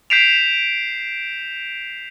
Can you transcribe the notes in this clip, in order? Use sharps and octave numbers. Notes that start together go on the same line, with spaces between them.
G6 B6 C7 D7 E7 F7